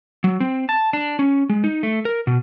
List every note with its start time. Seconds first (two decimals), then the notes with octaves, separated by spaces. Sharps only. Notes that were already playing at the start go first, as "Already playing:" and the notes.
0.24 F#3
0.40 C4
0.69 A5
0.93 D4
1.19 C#4
1.49 G#3
1.64 D#4
1.83 A3
2.05 A#4
2.27 B2